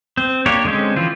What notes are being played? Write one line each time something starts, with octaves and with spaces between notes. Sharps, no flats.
C4
A#3 D4 G4 C#5
D3 G#3 C4 C#4
E3 F3 C4 F4